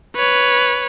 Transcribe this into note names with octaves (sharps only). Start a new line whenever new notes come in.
B4 C#5